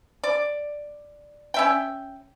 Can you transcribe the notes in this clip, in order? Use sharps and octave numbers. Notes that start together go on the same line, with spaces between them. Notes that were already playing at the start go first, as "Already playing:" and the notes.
D5
C#4 E5 G5